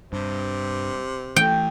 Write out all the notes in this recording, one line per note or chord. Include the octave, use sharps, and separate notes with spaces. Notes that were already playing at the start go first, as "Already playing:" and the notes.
G2 C3
E3 A3 G5